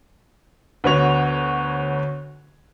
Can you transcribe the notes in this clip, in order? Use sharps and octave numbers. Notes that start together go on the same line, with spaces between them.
D2 D3 B3 F#4 C#5 F7